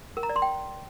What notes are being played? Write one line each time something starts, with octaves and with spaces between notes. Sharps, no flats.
A#4
A#5
D5
C6
G5